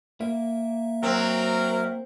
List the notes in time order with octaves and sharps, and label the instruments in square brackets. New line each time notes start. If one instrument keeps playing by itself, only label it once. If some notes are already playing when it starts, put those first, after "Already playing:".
[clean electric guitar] A#3 [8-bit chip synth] E5
[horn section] F#3 A#4 [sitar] C4